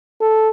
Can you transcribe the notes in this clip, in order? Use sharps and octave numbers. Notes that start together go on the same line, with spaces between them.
A4